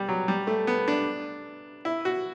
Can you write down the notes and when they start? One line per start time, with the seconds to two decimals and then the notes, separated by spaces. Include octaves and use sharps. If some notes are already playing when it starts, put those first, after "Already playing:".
Already playing: G3
0.09 F#3
0.28 G3
0.47 A3
0.67 B3
0.88 D4
1.85 E4
2.05 F#4